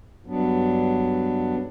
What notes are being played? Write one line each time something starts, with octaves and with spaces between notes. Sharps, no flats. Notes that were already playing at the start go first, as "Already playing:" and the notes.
G2 F#3 B3 D4